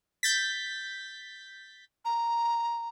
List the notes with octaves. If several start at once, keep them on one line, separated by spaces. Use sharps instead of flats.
G6 A6 B6
A#5